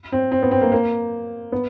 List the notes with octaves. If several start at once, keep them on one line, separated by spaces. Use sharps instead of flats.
C4
C4
B3
C4
A#3
A#3
B3